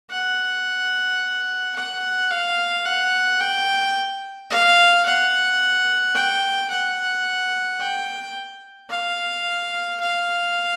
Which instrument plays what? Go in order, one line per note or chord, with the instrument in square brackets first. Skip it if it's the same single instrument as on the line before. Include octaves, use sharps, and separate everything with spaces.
[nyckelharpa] F#5
F#5
F5
F#5
G5
F5
F#5
G5
F#5
G5
F5
F5